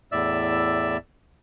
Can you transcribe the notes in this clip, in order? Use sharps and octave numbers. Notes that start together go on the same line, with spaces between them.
E2 A2 D5 E5 E6